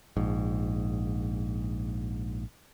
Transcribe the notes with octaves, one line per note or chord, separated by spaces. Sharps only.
A#1 G#2